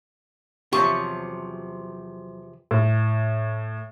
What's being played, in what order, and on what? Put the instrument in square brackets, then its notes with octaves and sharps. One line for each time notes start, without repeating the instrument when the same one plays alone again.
[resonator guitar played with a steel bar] E2 C3 F3 [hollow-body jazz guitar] F#3 G4 [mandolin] C#6
[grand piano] A2